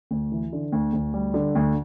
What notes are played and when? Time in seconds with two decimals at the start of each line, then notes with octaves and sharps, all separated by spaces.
0.11 D2
0.32 E3
0.53 D3
0.72 D2
0.93 D2
1.14 G3
1.34 D3
1.55 D2